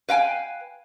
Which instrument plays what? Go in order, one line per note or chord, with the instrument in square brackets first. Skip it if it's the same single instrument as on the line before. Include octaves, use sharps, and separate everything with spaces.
[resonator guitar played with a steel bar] B4 F5 G5 G#5